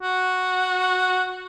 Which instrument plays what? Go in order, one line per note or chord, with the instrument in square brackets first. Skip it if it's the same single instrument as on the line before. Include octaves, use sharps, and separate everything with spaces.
[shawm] F#4